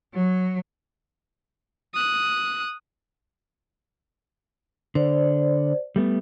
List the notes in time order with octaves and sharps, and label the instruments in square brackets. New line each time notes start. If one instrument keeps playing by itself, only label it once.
[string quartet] F#3
[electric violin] D#6 F#6
[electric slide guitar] D3 [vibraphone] C5 D5
[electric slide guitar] G3 A3 B3